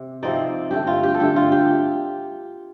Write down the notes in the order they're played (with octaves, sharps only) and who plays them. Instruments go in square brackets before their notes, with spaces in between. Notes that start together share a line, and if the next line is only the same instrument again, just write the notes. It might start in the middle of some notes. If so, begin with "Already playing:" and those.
Already playing: [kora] C3
C3 F3 C4 D#4 D5
G2 D3 A3 G4
F4
G4
A4
G2 D3 A3 G4
F4
G4